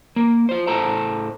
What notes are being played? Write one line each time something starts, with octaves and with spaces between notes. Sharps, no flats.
A#3
F4 C5
A2 A4 C5 A5 A#5